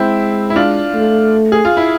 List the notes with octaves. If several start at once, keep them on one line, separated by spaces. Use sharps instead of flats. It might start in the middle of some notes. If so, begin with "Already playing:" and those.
Already playing: G#3 C4 E4
E4
D4 F4
A3
G#4
F4
E4